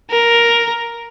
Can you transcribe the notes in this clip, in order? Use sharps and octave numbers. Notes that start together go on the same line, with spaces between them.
A#4